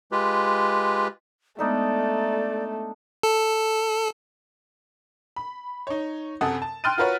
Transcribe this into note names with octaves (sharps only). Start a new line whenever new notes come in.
G#3 F4 G4 B4
G#3 A3 B3 D4 D#4 A4 D5
A4
B5
D#4 C#5
F#2 C3 A4 F#5 D#6
A5
G5 C6 F6 F#6 A6 D#7
F4 F#4 A#4 B4 C#5 F#5